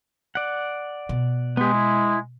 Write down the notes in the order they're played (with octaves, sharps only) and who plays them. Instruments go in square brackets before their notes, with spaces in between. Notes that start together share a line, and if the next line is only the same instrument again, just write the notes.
[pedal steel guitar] D5 F#5
[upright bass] B2
[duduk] G#3 [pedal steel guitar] B3 G4
[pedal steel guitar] E4